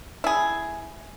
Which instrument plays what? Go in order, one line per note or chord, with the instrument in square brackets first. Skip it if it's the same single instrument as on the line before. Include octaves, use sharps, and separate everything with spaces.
[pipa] E4 G#4